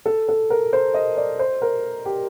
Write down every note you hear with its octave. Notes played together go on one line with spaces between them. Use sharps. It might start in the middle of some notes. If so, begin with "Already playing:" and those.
A4
A4
A#4
C5
D#5
D5
C5
A#4
G4